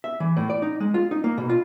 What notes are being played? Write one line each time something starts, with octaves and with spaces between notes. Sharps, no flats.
E5
E3
A2
D5
D#4
G#3
F4
D#4
A#3
B2
F4